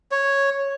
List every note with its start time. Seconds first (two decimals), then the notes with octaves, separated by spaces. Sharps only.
0.11 C#5